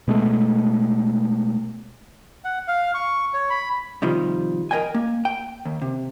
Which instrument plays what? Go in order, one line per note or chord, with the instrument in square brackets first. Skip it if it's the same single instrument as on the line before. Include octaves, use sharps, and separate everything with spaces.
[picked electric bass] B2 G#3 A3
[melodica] F#5
F5
C#6
C#5
B5
[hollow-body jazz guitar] C3 D#3 F3 G3
A#4 C5 D#5 G5 G#5
A#3
G5
D#2
C3